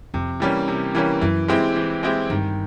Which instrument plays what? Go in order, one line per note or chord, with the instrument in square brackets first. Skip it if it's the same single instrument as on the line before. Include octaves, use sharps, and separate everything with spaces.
[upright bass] F2 [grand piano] C3
[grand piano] E3 G3 A#3 C#4
C3
E3 G3 A#3 C#4
[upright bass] F#2 [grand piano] E3
[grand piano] G#3 C4 E4 G4
E3
G#3 C4 E4 G4
[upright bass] G2 [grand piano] D#3